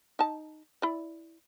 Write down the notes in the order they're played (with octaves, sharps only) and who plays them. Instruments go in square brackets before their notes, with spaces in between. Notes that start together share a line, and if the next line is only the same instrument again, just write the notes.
[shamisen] D#4 A5
E4 D5